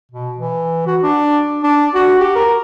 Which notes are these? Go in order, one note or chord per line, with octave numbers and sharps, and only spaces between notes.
B2
E3
F#4
D4
D4
F#4
G4
A#4